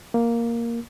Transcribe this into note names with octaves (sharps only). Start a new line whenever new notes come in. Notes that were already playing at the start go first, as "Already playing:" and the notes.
A#3